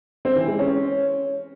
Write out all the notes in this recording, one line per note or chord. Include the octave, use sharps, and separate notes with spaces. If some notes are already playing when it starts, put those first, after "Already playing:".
C4
E3
G#3
C#4